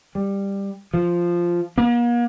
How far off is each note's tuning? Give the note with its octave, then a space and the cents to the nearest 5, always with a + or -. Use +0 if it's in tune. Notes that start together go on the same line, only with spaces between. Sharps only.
G3 +15
F3 -5
A#3 +40